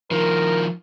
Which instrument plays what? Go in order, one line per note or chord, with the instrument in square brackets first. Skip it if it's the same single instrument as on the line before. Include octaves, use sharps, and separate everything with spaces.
[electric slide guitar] D#3 F3 [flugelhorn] A#4